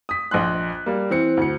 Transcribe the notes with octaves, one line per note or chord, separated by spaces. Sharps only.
D#6 B6
A#1 D#5 C6 F#6
G3 A#3
E3 C4 C#7
D2 C#7